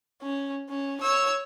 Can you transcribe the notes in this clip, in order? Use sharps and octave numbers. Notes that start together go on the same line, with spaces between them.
C#4
C#4
C#5 E6